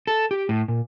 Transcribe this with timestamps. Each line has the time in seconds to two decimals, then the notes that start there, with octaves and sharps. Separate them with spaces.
0.07 A4
0.31 G4
0.49 A2
0.68 A#2